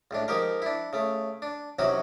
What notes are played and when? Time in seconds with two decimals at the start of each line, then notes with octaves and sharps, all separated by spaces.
0.11 C#2 A2 D4
0.28 F3 G#3 D#4 G4 A#4
0.62 D4 E4
0.93 C#3 A3
1.42 D4
1.79 C3 E3 F#3 C#4 D#4 F#4